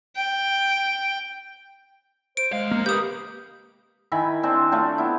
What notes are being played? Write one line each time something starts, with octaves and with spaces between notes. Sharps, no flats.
G5
C5 D7
D#2 G#3 F5
A#3
C3 G4 B4 D#6 G6
D#3 E4 G#5 B5
C4 D4 C5
A3 D4 F4 G5
B3 E4